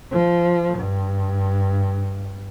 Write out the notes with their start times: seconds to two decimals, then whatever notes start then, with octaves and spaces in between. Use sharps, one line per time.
0.11 F3
0.78 G2